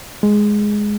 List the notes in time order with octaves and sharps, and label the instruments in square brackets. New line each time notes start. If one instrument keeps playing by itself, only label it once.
[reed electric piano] G#3